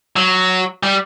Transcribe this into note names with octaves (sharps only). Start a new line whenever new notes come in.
F#3
G3